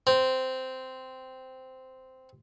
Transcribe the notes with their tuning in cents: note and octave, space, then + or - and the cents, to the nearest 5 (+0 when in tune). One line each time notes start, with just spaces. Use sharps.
C4 -10